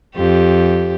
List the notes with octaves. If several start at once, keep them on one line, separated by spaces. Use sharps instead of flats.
F2 G4